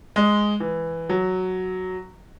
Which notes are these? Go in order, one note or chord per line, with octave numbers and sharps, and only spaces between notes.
G#3
E3
F#3